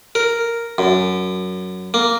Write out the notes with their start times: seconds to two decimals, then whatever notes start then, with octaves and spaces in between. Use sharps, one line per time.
0.15 A#4
0.78 F#2
1.94 A#3